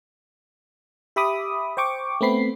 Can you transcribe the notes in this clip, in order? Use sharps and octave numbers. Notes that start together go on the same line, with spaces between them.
G4 E5 B5 D6 D#6
C5 G5 C#6 D6
A3 B3 C4 B5 C7